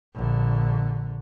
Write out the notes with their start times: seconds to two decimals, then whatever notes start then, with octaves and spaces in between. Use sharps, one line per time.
0.15 A#1 D3